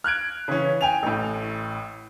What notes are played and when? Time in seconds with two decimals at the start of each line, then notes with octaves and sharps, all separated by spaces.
0.04 F6 F#6 G#6 D7
0.48 C#3 E3 C#4
0.81 G5 G#5 F7
1.03 A1 A2